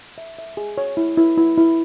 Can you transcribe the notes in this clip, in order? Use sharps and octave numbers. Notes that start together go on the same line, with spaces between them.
E5
E5
G#4
C#5
E4
E4
E4
E4